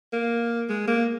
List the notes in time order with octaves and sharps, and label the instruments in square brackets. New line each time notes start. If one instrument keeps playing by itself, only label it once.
[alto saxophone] A#3
G#3
A#3